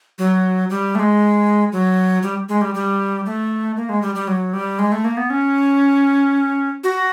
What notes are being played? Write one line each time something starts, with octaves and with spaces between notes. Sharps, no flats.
F#3
G3
A3
G#3
F#3
G3
G#3
G3
G3
A3
A#3
G#3
G3
G3
F#3
G3
G#3
A3
A#3
B3
C#4
F#4